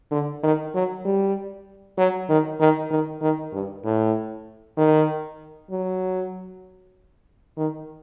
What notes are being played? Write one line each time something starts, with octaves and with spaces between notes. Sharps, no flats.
D3
D#3
F#3
G3
F#3
D#3
D#3
D#3
D#3
G2
A2
D#3
F#3
D#3